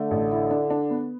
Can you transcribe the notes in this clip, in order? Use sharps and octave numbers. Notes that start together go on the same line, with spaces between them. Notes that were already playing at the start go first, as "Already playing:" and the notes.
Already playing: D3 A3
A1
E4
D4
D4
B3